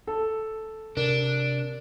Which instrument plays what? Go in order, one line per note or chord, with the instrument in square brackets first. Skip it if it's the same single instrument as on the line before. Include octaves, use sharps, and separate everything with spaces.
[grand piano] A4
[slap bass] C3 [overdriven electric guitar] D4 [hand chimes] A#4